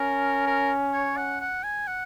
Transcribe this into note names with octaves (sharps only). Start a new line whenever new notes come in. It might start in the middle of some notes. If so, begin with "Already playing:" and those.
Already playing: C#4 A#4
A#4
C#5
F#5
F#5
G#5
F#5